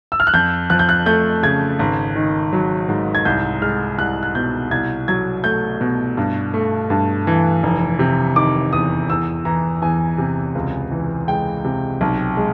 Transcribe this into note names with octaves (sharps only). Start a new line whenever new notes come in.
E6
F6
F#6
F2 G6
F3 F#6
G6
F#6
A3 G6
C#3 G#6
G#1
D#3
F#3
G#2
G#6
C2 G6
G#3 F6
C2 F#6
F#6
B2 G6
C2 G#6
F#3 G#6
A3 G6
B2
G2
A3
G2
E3
F1
C3
D#3 D6
E2 D#6
E2 E6
E3 A#5
E2 G#5
C3
C#2
E3
G#3 G5
C3
B1
G#3